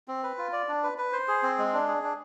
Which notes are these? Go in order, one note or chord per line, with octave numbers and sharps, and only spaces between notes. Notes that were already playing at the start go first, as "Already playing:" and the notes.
C4
B4
F4
D5
D4
B4
B4
C5
G#4
C4
G#3
D4
G#4
D4